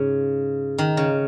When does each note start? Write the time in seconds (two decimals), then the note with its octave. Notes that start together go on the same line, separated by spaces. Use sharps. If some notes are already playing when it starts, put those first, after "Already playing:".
Already playing: G#2 C#3
0.78 D#3
0.97 C#3